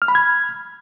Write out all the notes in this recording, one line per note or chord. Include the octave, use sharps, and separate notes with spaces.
F6
B5
G#6